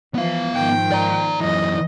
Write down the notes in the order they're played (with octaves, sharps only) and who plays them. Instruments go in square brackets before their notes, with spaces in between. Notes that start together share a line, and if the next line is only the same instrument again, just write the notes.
[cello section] E3 F3 [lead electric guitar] B3 F5
[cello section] G#2 D#3 F3 [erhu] G5
[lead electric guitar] D5 A#5
[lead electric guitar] F#2 E3 [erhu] D#5